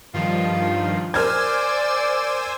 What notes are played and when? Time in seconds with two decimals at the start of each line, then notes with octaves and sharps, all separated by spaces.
0.14 G2 D#3 F3 F4
1.14 A#4 C5 D5 G#5 E6 F6 G#6